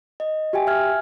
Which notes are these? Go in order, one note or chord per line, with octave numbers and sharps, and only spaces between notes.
D#5
F#4 G4 E5 G5 G#5
E5 G#5 F6 G#6